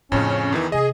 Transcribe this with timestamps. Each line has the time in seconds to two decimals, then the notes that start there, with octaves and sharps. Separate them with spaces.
0.12 F2 A2 C#3 C#4 D4
0.52 E2 D#3 E3
0.72 C3 D#4 G#4 D#5